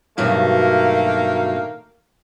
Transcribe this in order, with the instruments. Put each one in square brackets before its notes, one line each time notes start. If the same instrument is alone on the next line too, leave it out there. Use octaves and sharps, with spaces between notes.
[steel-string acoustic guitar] G2 B2 F#3 [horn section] D#3 A3 A#3